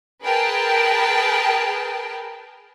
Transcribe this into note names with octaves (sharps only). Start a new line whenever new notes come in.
G#4 A#4 B4 G5 A5